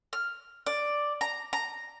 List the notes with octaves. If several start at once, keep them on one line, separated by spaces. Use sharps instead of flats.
F6
D5
A#5
A#5